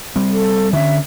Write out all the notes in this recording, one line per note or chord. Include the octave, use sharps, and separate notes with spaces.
G3 C4
A4
D3 C#4 E5